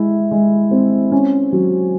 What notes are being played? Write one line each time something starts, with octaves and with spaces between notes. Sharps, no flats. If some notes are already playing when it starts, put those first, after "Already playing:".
Already playing: G#3 E4
G#3
C4
C#4
F#3